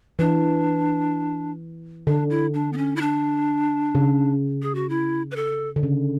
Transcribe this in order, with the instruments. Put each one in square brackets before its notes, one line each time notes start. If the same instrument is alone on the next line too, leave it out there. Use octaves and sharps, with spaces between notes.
[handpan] E3 [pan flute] D4
[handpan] D3 [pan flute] D4
[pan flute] E4
D4
B3
C#4
E4
D4
[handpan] C#3
[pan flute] G#4
F#4
E4
B4
A4
[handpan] D3
C#3